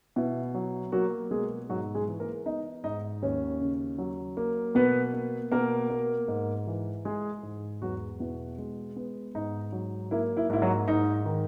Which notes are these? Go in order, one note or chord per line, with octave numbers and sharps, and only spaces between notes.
B2 E4
F#3
F#3 A#3 F#4
B2 G#3 G#4
G#2 F#3 F#4
G#3 G#4
E3
A#3 A#4
B3 D#4 D#5
G#2 D#4 D#5
D#2 C#4 C#5
C#3
F#3
A#3
B2 B3 B4
A#3
B2 A#3 A#4
A#3
G#2
E3
G#3 G#4
G#2
E2 F#3 F#4
B2 E4
G#3
B3
G#2 D#4
F#3
A#3 E4
E4
G#2 E4
F#3 F#4
G#2 D#4
D#3